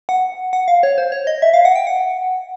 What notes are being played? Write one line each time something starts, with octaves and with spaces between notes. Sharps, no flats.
F#5
F#5
F5
C#5
C5
C#5
D#5
E5
F5
F#5
G5
F#5